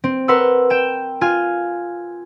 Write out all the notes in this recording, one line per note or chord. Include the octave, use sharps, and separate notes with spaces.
C4
A#4 B4 F#5 C6 E6
G5 E7
F4 G#5 F6